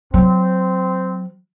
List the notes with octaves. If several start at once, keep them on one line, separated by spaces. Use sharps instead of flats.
F#3 C4